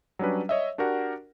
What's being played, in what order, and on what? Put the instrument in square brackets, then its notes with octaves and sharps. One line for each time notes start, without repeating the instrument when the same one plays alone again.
[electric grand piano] F#3 G3 C#4 D4 B4
C#5 D#5 E5
D4 F#4 G4 A#4 F#5